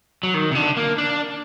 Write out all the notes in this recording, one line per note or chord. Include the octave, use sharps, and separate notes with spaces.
F#3
D#3
C3
D3
A#3
D4